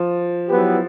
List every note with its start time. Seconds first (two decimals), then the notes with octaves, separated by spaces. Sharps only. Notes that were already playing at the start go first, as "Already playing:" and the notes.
Already playing: F3
0.48 F#3 B3 E4 G4 B4